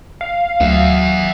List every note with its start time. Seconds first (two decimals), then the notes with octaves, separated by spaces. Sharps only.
0.21 F5
0.61 D2 F#3 E5 F#5